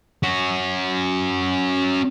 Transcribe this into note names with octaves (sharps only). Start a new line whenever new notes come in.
C#4 F#4